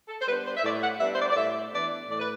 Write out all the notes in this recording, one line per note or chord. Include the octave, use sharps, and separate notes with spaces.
A4
C5
G3 B3 D4 B4
C5
E5
A2 D5
F#5
G3 B3 D4 E5
C5
D5
D5
A2 E5
E3 B3 D4 D5
A2 D5
B4